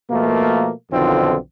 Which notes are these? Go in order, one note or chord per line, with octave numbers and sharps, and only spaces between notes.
B2 F3 A3 A#3
B1 F2 D3 D#3 C4 F4